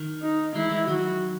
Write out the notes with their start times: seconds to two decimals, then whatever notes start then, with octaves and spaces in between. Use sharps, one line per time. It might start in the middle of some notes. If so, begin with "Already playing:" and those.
Already playing: D#3
0.22 D#4
0.55 E3 G#3 E4
0.71 E3 G#3
0.88 D#3 F#3 F#4